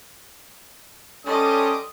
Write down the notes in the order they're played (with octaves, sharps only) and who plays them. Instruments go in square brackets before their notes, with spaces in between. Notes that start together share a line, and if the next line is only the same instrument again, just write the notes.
[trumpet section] G3 C6 D#6 [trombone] C#4 [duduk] A4 [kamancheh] D#5 D6